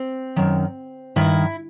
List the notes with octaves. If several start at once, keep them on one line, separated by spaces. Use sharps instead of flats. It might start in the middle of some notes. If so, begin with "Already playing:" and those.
Already playing: C4
F#2 D#3
G2 D#3 E4